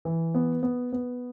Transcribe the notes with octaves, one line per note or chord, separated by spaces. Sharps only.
E3
B3
B3
B3